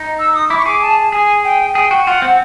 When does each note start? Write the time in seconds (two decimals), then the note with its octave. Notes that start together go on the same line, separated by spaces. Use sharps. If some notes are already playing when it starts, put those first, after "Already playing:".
Already playing: D#4
0.19 E6
0.34 D#6
0.50 E4 D6
0.58 C#6
0.65 G#4 D6
0.82 A5
1.12 G#4 G#5
1.44 G5
1.75 G#4 G5
1.91 F#4
2.06 F4 F#5
2.22 C4